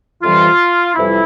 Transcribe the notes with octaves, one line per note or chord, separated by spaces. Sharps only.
F2 C3 E3 G3 F4
F2 C3 E3 G3 E4